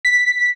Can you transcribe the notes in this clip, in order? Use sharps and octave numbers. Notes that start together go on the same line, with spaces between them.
B6